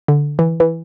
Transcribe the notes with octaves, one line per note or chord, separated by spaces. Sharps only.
D3
E3
E3